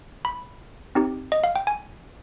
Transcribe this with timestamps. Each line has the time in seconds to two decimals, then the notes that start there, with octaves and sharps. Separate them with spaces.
0.25 B5
0.95 C4 D#4 G4
1.32 D#5
1.44 F5
1.56 G5
1.67 G#5